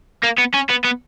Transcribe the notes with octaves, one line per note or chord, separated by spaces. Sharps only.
A#3
B3
C#4
B3
B3